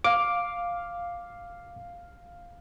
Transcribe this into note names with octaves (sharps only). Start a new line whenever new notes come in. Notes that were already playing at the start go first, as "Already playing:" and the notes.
F5 D6